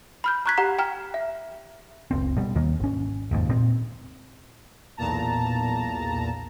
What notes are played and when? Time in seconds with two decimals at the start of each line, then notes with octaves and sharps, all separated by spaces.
0.24 B5 F6 G6
0.46 A#5 C#6 F#6 G#6 B6
0.58 G4 F#5 A#5
0.79 G5 A#5 F6
1.14 E5
2.11 F#1 C#2 C4
2.37 B2 G3
2.55 D#2 D#3 A#3
2.80 G#1 C#4
3.31 F1 D#2 G#2
3.49 A#2 C4
4.97 B1 E2 A#2 A5 A#5